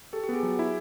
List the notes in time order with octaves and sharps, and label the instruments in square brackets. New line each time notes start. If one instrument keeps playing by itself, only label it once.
[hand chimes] G4 [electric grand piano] A4
[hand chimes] G4
[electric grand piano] B3 [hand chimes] G#4
[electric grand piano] F#3
E4